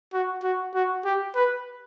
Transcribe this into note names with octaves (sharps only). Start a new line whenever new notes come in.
F#4
F#4
F#4
G4
B4